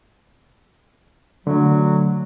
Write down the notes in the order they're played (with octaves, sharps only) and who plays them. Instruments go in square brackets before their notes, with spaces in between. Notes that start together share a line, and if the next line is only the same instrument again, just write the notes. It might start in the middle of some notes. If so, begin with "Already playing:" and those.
[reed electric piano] D3 A3 [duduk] F#3